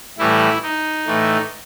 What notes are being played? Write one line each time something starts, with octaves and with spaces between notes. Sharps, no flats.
A2 E3 G3 E4
D#4
A2 E3 A3